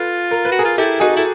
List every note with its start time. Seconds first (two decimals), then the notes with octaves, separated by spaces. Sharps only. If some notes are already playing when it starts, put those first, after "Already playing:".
Already playing: F4 A4 B4
0.31 A#4
0.45 B4
0.52 F#4
0.59 G#4 A#4
0.65 F4
0.78 E4 G4 A4
1.00 D#4 F#4 G#4
1.16 E4 A4